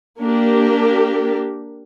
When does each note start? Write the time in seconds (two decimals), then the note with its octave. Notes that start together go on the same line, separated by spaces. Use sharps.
0.22 A#3 D4 G4 A#4